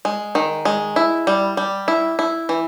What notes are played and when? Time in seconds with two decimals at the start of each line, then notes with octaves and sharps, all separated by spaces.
0.05 G#3
0.35 D#3
0.65 G#3
0.96 E4
1.27 G3
1.57 G3
1.88 E4
2.19 E4
2.49 E3